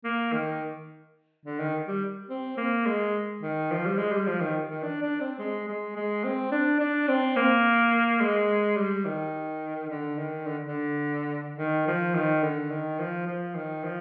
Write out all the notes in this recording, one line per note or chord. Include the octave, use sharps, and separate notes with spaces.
A#3
D#3
D3
D#3
G3
C4
A#3
G#3
D#3
F3
G3
G#3
G3
F3
D#3
D#3
D4
D4
C4
G#3
G#3
G#3
C4
D4
D4
C4
A#3
G#3
G3
D#3
D3
D#3
D3
D3
D#3
F3
D#3
D3
D#3
F3
F3
D#3
F3